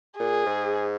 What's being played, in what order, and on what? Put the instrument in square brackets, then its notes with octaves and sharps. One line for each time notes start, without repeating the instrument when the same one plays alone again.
[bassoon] A#2 [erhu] G#4
[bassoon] G#2